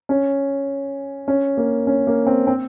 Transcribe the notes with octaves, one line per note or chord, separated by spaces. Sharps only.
C#4
C#4
A#3
C#4
A#3
C4
C4